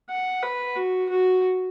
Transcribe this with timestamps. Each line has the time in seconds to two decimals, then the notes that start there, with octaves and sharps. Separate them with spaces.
0.10 F#5
0.43 B4
0.76 F#4
1.09 F#4